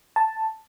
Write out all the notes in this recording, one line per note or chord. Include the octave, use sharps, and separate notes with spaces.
A5